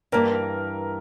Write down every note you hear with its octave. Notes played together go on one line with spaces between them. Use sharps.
G2 E3 A#3 A#4